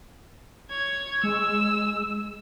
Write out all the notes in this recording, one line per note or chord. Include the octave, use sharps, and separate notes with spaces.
C#5 G#6
G#3 E6